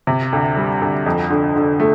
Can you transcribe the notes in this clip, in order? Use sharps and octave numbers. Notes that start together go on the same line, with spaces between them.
C3
D2
G3
D2
F2
D3
D3
A3